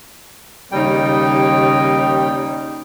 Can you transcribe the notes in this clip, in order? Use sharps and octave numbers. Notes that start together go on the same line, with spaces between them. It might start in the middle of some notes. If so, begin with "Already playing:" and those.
D#2 C#3 G3 D#4 G5